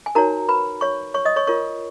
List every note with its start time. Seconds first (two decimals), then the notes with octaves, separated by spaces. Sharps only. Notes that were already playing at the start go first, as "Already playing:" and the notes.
0.06 G#5
0.15 D#4 F#4 A#4 C#5 A#5
0.49 B4 B5
0.81 C#5 C#6
1.14 C#5 C#6
1.25 D#5 D#6
1.36 C#5 C#6
1.47 F4 A#4 C#5 C#6